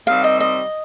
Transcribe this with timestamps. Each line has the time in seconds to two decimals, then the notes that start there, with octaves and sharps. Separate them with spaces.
0.07 C3 D#3 G3 C4 F5
0.24 D#5
0.40 D#5